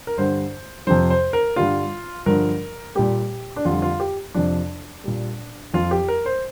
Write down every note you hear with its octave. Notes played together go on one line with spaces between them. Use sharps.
A#4
G2 D3 G3 C5
F2 C3 F3 C5
C5
A#4
G2 D3 G3 F4
G2 D3 F3 A#4
A#2 G3 G4
D4
F2 D3 G3 F4
F4
G4
F2 C3 F3 D4
A#2 G3
F2 F3 F4
G4
A#4
C5